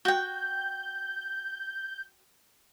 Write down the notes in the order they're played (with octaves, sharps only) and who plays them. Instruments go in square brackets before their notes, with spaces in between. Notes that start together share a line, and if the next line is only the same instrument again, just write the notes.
[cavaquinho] F#4 G5 [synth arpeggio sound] G6